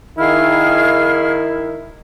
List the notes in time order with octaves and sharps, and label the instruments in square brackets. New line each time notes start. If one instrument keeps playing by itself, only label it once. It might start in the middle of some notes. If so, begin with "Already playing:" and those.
[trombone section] D#3 E4 [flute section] G#4 F5 F6